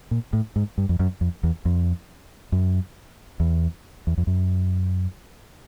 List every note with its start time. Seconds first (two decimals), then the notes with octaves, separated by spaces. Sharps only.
0.11 A#2
0.33 A2
0.56 G#2
0.78 G2
0.89 F2
0.99 F#2
1.21 F2
1.43 E2
1.65 F2
2.52 F#2
3.40 E2
4.07 E2
4.18 F2
4.27 F#2